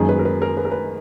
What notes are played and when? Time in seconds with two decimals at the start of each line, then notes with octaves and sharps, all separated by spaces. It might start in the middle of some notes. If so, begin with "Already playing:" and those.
Already playing: F#1 F#2 D#3 G#3 G#4
0.09 B4
0.19 A#4
0.25 B4
0.42 A#4
0.57 B4
0.65 A#4
0.71 B4